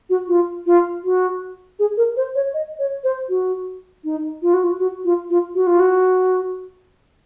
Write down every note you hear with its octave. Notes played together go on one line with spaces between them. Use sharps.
F#4
F4
F4
F#4
G#4
A#4
C5
C#5
D#5
C#5
C5
F#4
D#4
F4
F#4
F4
F#4
F4
F4
F#4
F4
F#4